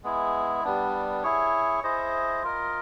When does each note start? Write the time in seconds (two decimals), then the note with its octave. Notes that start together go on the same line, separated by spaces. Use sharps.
0.04 G#3 B3 E4 G#4
0.64 G3 B3 D4
1.23 E4 G#4 C#5
1.84 E4 G#4 C5 D#5
2.43 F4 A#4 D#5